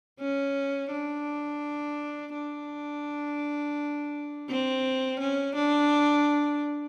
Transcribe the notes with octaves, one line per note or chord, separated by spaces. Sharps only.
C#4
D4
D4
C4
C#4
D4